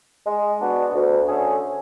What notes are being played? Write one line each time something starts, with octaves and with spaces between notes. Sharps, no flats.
G#3
B3 D4 F#4
D2
D3 A3 C#4 G#4